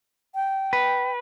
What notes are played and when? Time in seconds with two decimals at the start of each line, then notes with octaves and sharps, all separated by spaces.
0.35 G5
0.73 B4